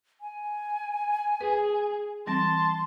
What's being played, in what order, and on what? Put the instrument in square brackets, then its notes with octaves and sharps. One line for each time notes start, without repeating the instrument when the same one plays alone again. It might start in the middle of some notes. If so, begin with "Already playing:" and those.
[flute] G#5
[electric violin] G#4 [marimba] B4
[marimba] E3 G3 C4 [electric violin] A5 [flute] C6